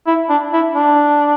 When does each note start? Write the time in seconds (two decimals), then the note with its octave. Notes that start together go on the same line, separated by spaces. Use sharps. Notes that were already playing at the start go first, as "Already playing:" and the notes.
0.07 E4
0.29 D4
0.53 E4
0.75 D4